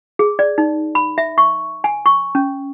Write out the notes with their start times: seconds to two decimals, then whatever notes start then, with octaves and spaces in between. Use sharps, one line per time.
0.19 G#4
0.39 D5
0.58 D#4
0.95 B5
1.18 E5
1.38 C#6
1.84 G#5
2.06 C#6
2.35 C#4